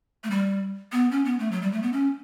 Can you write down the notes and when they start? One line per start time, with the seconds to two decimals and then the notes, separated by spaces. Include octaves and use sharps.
0.24 A3
0.31 G3
0.92 B3
1.11 C#4
1.25 B3
1.39 A3
1.52 F#3
1.62 G3
1.72 A3
1.83 B3
1.93 C#4